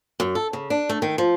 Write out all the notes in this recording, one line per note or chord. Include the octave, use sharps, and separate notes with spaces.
F#2
A4
C#3
D4
A3
D#3
F3